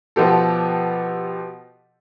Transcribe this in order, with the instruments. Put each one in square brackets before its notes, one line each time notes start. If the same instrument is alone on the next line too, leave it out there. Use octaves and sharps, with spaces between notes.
[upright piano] B2 F3 B3 G4 A4